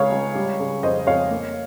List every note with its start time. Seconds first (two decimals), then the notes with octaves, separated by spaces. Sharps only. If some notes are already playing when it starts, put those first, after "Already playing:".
Already playing: C#2 C#3 C#5 F5
0.12 C#2
0.35 G3
0.60 C#3
0.83 F2 C5 D#5
1.07 F2 C#5 F5
1.31 A#3